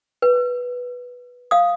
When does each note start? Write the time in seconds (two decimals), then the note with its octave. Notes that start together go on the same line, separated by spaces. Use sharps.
0.22 B4
1.51 F5 D#6